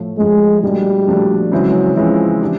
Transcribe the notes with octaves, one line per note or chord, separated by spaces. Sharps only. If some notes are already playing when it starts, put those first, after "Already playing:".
Already playing: A2 F3 A3
A2 F3 G#3 A3
A#2 F3 G3 A3 D4 F#4
A#2 F3 A3 D4 F#4
C#3 E3 F#3 G#3 C4 E4
C#3 E3 F3 G#3 C4 E4
D4 G4